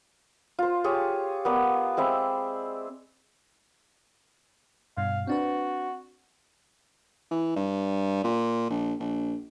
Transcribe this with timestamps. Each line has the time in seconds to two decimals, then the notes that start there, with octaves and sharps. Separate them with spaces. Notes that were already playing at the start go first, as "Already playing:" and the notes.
0.59 F4 C5
0.84 G4 G#4 C#5
1.45 B3 A#4 D5
1.97 G#3 C4 E5 B5
4.97 G2 B2 F5
5.27 C4 D4 F#4 B4
7.31 E3
7.56 G2
8.24 A#2
8.70 A#1
9.00 A#1